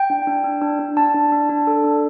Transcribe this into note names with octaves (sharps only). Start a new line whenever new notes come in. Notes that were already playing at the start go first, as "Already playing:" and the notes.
Already playing: G5
D4
D4
D4
D4
D4
D4 A5
D4
D4
D4
A4
D4